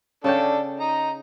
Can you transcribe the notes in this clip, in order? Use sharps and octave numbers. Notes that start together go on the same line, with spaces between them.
C#3 D4 A4 C#5 G5
D#4 A#5